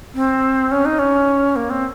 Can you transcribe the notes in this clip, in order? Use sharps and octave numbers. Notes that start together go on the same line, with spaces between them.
C4
C#4
D#4
C#4
A#3
C4